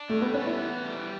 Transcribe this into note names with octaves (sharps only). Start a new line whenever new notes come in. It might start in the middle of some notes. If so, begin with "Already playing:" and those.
Already playing: D4
G3 A3
B3
B3 C#4
E4
E3
G3